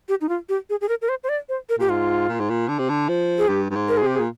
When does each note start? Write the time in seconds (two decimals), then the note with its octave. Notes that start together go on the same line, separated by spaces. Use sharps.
0.09 G4
0.21 D#4
0.29 F4
0.49 G4
0.70 G#4
0.81 G#4
0.89 A#4
1.02 A#4
1.09 C5
1.24 C5
1.29 D5
1.49 C5
1.69 A#4
1.78 A#2 G4
1.88 G#2 F4
2.29 A#2
2.40 G#2
2.50 A#2
2.68 D3
2.79 C3
2.89 D3
3.09 F3
3.38 G#4
3.48 G2 G4
3.70 G2
3.75 G#2
3.88 A#4
3.97 G#4
4.02 C3 G4
4.15 G#4
4.19 A#2